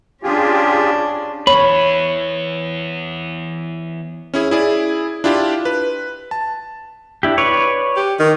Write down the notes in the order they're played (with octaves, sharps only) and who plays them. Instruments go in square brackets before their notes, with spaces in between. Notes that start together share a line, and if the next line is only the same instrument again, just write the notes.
[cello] C#4 D4 [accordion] F4 G4 G#4
[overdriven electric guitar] E3 B3 [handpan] C#5 [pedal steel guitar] B5
[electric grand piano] C#4 E4 G#4
E4 G#4 D5
D4 E4 F4 G4
B4
A5
[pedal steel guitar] D4 E4 G4
B4 C#5 D5
[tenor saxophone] G4
D#3